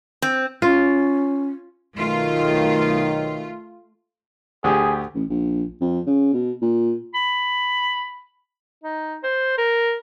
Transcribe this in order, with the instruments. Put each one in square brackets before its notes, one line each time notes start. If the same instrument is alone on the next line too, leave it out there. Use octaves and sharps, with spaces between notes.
[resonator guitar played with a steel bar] C4
[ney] C#4 [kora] F4
[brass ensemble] B1 D#3 [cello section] A3 F4
[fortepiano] D2 G4 [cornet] G#4
[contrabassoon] A1
A#1
F2
C#3
B2
A#2
[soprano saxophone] B5
D#4
C5
A#4